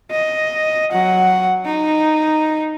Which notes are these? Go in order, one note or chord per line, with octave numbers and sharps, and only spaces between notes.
D#5
F#3 F#5
D#4